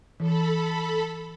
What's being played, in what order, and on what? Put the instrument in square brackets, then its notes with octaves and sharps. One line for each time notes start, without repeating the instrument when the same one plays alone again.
[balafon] E3 [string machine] A4 B5